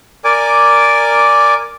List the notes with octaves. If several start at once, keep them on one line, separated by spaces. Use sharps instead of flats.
A#4 D5 G#5 D6